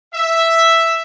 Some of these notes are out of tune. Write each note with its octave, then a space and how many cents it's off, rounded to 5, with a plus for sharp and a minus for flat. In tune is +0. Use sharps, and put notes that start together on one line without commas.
E5 +0